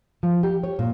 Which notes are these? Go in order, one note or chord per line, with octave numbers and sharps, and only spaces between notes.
F3
G4
C#5
A#2